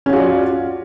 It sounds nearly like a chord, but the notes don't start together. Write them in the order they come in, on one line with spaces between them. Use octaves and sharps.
C#4 F5 F#4 F4 D5